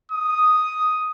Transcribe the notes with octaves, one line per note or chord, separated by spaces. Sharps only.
D#6